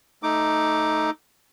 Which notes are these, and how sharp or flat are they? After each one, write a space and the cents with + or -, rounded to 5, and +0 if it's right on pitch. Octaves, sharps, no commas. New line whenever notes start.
A3 -5 D#4 +0 D6 +0